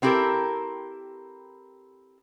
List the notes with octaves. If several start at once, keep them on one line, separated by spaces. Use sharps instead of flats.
B3 C4 E4 G4 A4 A#4